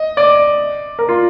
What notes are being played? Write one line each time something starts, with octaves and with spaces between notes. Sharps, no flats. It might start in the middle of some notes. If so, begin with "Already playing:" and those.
Already playing: D#5
D5
A#4
F4